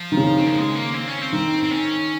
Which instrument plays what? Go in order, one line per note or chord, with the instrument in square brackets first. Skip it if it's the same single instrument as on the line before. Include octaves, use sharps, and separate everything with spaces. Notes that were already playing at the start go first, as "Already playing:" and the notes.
Already playing: [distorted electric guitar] F3
[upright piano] D#3
C#3
[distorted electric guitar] C4
A#3
G#3
A#3
C4
C#4
C4
[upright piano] D#3
[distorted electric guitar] C4
C#4